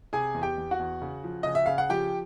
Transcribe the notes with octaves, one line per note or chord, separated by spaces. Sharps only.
C3 G#4 G#5
E2
G4 G5
E2
F#4 F#5
E2
C#3
F3
C#3 D#5
E5
C#3 F5
F#5
F3 G4 G5